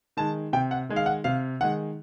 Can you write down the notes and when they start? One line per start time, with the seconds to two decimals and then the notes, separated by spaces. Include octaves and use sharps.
0.17 D#3 G#3 A5
0.53 C3 G5
0.71 F#5
0.89 D#3 G#3
0.96 F5
1.06 F#5
1.24 C3 F5
1.61 D#3 G#3 F#5